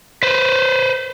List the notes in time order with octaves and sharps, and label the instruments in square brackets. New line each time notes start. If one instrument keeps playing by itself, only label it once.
[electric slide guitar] B4 C5